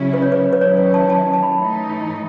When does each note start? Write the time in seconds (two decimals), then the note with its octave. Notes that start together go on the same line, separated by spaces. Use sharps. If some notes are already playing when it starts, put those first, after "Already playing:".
Already playing: C#3 F#3 C#4 E4
0.13 B4
0.22 C#5
0.32 B4
0.53 B4
0.61 D#3 F#3 C#4 E4 C#5
0.77 B4
0.94 A5
1.10 A5
1.33 A5
1.43 B5
1.52 A5
1.58 A2 E3 A3 D#4